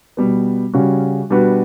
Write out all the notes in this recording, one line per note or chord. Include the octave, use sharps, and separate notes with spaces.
B2 G3 B3
C#3 G3 C#4 F#4
B2 G3 D4 F#4 B4